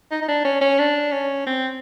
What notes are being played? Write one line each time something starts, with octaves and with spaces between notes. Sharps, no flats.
D#4
D#4
D4
C#4
C#4
D4
C#4
C4